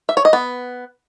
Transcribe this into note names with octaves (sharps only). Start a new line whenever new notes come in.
E5
C#5
D#5
B3